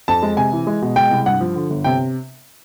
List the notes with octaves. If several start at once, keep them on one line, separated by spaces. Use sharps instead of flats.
F2 A5
G#3
C3 G#5
E3
G#3
B2
G#3 G5
C2
G2 F#5
F3
D3
G1
C3 G5